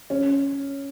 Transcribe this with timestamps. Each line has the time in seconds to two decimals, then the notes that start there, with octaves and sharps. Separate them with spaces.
0.10 C#4